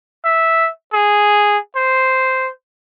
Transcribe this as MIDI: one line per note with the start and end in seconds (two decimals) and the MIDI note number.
0.25 0.69 76
0.94 1.58 68
1.76 2.50 72